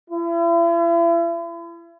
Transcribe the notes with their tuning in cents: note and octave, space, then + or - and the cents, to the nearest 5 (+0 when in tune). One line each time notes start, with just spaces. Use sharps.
E4 +40